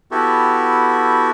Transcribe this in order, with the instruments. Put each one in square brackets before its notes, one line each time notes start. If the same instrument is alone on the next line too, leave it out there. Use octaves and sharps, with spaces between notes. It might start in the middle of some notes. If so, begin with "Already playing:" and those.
[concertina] B3 E4 F#4 G4 A4